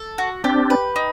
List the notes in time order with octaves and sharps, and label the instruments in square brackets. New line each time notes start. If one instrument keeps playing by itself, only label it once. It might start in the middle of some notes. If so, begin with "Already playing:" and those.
Already playing: [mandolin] A4
F#4
[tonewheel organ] C4 D4 [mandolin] G4
[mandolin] B4
D#4